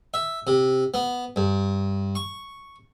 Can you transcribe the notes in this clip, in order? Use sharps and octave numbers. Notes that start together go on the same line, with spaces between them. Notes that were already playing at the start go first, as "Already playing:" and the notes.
E5
C3
B3
G2
C#6